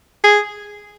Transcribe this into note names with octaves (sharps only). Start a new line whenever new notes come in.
G#4